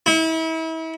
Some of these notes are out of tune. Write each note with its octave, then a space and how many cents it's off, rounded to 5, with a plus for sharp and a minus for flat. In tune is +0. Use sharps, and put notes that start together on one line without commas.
E4 -35